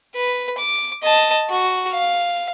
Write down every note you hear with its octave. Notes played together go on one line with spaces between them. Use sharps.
B4
D6
D#5 A5
F#4
F5